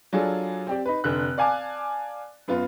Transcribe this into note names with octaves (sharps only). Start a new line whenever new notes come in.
F#3 D4 F4 G#4 A4
C4 G4 D5
D#4 B4
F1 D3 F#6
D5 F5 G#5 A5 D6
F#2 B3 F4